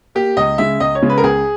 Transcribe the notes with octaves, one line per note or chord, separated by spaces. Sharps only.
A#3 G4
C#2 D#5
C#3 G#3 E5
C#2 D#5
C#5
C#3 G#3
B4
A#4
C#2 G#4